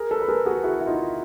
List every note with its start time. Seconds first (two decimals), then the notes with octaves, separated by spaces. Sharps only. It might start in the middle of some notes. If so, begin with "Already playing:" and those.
Already playing: G#4 A#4
0.11 A4 B4
0.22 B4
0.29 G#4 A#4
0.46 F#4 G#4
0.64 E4 F#4
0.81 E4
0.87 D#4 F4